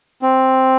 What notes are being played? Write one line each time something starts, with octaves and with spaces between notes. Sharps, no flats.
C4